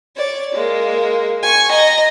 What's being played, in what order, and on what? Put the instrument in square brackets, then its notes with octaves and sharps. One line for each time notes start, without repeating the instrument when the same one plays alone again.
[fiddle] C#5 D5
G#3 A#3
G#5 C#6
D#5 A#5